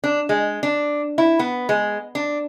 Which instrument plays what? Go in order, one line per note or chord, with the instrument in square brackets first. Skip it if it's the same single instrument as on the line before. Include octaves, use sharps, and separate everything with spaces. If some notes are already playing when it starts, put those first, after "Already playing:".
[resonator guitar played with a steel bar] D4
G#3
D4
E4
B3
G#3
D4